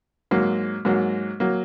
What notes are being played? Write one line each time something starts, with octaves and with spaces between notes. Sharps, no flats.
G#2 F#3 A#3
G#2 F#3 A#3
F#3 A#3